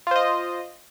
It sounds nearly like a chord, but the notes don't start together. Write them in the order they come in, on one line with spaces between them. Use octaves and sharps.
F4 C5 D#5